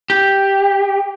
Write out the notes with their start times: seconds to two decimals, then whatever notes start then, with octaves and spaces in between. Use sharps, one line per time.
0.10 G4